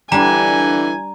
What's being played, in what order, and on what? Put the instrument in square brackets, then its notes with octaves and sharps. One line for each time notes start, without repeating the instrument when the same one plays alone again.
[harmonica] D3 E3 [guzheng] G3 D4 [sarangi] G#5 [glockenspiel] A#5